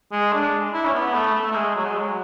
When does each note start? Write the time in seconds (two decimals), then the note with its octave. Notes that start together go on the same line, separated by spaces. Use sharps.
0.12 G#3
0.33 D4
0.73 E4
0.86 C#4
0.94 B3
1.14 A3
1.34 A3
1.52 A3
1.56 G#3
1.76 F#3
1.86 G#3
1.98 F#3